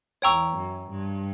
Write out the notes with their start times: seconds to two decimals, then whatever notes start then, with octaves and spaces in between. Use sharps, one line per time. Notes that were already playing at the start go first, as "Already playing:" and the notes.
0.22 E2 C#5 G5 A#5 C#6 E6
0.56 F#2
0.90 G2